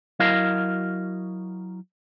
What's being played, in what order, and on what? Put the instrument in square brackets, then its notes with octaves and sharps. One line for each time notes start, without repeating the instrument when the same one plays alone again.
[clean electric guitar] F#3 E4 F#4 A#4 D#5 F5